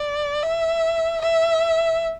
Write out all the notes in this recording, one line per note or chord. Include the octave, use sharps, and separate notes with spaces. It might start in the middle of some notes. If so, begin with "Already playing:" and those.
Already playing: D5
E5
E5